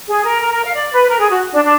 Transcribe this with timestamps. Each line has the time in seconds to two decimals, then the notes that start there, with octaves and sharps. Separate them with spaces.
0.09 G#4
0.25 A#4
0.42 A#4
0.53 A#4
0.64 F5
0.75 D5
0.92 B4
1.08 A#4
1.19 G#4
1.30 F#4
1.53 D4
1.64 D4